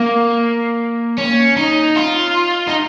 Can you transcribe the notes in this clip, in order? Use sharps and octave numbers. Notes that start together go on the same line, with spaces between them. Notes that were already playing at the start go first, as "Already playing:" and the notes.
Already playing: A#3
C#4
D#4
F4
D#4